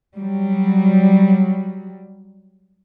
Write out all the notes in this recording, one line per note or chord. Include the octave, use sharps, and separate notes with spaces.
F#3 G3